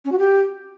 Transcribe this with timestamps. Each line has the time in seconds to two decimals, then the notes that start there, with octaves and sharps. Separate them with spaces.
0.05 C#4
0.12 F#4
0.19 G4